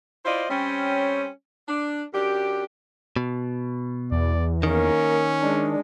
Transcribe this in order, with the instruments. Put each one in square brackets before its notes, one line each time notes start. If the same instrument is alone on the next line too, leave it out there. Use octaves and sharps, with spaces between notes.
[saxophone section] E4 F4 C5 D5 D#5
G3 C4 C#4
D4
F#2 D4 G4
[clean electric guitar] B2
[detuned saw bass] E2 [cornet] D5
[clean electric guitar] D#3 [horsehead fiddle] A#3 A#4 [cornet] C#4
[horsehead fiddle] G#3 [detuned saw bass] D4